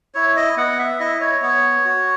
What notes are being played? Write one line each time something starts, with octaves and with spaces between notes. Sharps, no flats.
E4 C#5
D#5
B3 F#5
E5
E4 D#5
C#5
B3 C#5
F#4